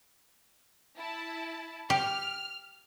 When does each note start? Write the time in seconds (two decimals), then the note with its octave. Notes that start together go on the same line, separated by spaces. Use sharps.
0.99 E4 A5
1.90 G4 F6